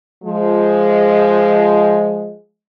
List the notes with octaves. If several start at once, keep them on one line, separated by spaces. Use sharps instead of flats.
F3 G#3